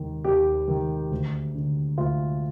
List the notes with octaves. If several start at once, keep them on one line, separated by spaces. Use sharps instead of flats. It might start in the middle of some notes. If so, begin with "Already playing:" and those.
Already playing: D#2 D#3
D#2 G4
D#3
D2
D3
D2 F4